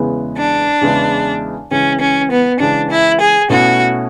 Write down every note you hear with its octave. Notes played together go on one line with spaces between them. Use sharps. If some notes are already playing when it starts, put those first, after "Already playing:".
Already playing: E2 C#3 G#3 B3 E4
D4
E2 C#3 G#3 B3 E4
C#3 E3 G#3 C#4
C#4
B3
C#3 E3 G#3 D4
E4
G#4
B2 A3 C#4 E4 F#4